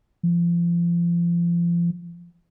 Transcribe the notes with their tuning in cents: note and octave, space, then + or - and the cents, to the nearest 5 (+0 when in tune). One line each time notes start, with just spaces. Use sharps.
F3 -30